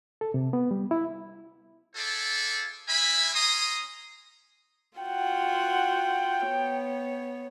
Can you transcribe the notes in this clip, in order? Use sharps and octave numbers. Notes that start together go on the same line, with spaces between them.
A4
C3
B3
G3
E4
F4 G#4 A4 C5 D5 E5
G#3 A#3 E5 G#5 B5
C#4 A#5 C6 D#6
F4 F#4 F#5 G5
B3 C#5